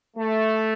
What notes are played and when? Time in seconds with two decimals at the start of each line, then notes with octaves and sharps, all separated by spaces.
0.17 A3